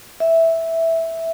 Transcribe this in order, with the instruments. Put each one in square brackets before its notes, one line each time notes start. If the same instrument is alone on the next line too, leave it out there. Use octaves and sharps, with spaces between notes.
[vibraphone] E5